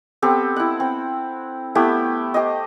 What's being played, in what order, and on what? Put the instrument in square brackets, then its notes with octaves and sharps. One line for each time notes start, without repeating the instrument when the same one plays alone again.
[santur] B3 C4 G4 A4
E4 F#5
C4
A3 B3 E4 G4
G4 C5 D#5